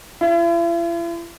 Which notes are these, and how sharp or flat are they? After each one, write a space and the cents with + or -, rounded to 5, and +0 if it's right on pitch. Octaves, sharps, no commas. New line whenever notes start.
E4 +45